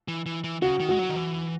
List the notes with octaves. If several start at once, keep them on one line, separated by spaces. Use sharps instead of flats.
E3
E3
E3
C#3 F#4
D#3
G#3 F#4
F#3
D#3
E3